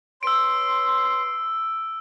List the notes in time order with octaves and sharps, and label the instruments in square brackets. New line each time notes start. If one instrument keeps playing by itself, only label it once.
[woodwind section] B4 C#5 C6 [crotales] E6 D7